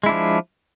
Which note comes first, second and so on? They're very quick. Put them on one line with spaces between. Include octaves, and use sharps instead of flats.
G#3 E4 D4 F3